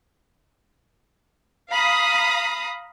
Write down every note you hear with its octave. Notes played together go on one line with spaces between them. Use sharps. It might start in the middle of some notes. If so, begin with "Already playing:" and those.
F5 A#5 B5 D#6